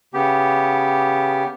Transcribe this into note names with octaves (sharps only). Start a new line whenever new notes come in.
C#3 B3 G4